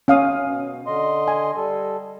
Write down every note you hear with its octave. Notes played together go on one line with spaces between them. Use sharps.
C#4 F5 D#6
B2
D3 D#5 C6
G#5
G3 A4